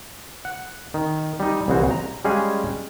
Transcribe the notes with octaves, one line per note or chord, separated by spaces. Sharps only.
F#5
D#3
G3 D#4
C2 C#3 E3 F#4 C5
A#5
G3 G#3 C#4 G#4 F5